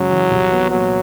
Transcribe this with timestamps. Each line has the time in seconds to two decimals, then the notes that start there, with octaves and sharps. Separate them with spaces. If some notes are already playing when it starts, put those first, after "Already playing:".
Already playing: F#2 C#3 F#3 G#3
0.11 E3
0.31 C2
0.52 B3
0.71 A#2 F#3